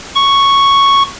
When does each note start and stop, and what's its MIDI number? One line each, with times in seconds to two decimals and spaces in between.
0.15 1.03 85